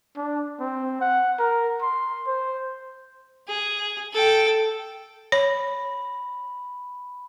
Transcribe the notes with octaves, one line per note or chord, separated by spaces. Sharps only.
D4
C4
F#5
A#4
C6
C5
G#4
A4 G5
C#5 B5